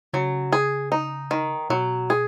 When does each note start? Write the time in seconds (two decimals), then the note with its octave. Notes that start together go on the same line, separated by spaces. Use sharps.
0.13 C#3 F#3
0.53 G#4
0.92 D#4
1.31 D#3
1.70 B2 F#3
2.10 G#4